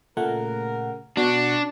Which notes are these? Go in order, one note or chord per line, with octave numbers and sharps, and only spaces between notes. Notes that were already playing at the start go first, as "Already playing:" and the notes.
A#2 C#3 A3 A#4 F#5
B2 D4 F#4